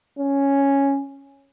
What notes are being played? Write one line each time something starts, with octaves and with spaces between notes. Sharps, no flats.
C#4